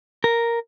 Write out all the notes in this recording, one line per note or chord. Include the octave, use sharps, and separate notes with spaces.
A#4